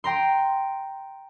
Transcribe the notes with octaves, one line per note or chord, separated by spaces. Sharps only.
G5 A#5 C6